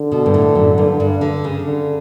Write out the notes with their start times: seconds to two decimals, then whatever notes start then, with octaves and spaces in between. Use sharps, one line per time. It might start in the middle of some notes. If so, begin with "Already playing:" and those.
Already playing: D3
0.11 B2
0.26 G2
0.34 A2
0.55 F#2
0.78 G2
1.00 G2
1.21 D3
1.44 C#3
1.66 D3